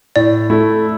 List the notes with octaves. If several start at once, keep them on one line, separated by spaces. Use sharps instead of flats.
A2 D5
A3 E4